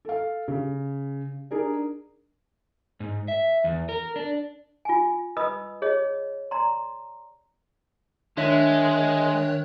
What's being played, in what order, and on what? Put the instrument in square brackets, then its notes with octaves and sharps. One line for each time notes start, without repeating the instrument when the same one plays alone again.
[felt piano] A4 F5
C#3
D4 D#4 G#4 A#4
[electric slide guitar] G#2
E5
E2
A#4
D4
[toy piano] F4 G#5
B4 D#5 B5 D#6 E6
G#4 C#5 D#5
D5 A#5 C6
[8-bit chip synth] D#3 C#5 F#6 [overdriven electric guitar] G#3 [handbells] D4 E5 B6